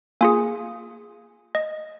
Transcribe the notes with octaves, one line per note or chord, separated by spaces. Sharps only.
A#3 F4 G#4 G#5
D#5